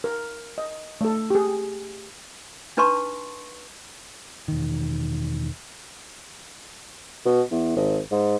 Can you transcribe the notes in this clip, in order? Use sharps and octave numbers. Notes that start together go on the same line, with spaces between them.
A#4
D#5
A3 A4
G4 G#4
D4 D#4 B4 A5 C6 C#6
E1 D#3
B2
E2
G#1
G#2